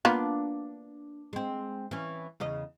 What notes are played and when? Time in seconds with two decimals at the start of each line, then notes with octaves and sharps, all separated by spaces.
0.05 A#3 B3 D4 F4
1.33 G#3 C4
1.91 E3 C#4
2.40 E2 C#3 D#5